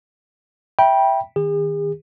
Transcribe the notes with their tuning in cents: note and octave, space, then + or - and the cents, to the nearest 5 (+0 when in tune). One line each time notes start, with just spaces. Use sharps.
E5 +0 G5 +0 B5 -35
D#3 -5 G#4 -45